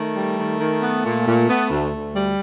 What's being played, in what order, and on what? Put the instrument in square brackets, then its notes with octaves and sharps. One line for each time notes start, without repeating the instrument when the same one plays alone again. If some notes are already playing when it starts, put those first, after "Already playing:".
Already playing: [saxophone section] D#3 [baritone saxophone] A3
[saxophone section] G3
D#3
D#3
B3
A#2
A#2
B3
D2
D2
G3